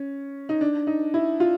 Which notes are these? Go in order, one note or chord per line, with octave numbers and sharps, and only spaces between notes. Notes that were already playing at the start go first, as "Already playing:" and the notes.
Already playing: C#4
D#4
D4
D#4
E4
F4